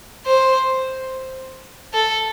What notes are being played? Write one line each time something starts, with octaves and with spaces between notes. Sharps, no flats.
C5
A4